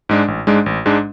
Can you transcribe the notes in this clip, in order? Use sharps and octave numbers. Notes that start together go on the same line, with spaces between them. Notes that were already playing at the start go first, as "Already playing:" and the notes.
G#2 G#3 D4
A1
G#2 G#3 D4
A1
G#2 G#3 D4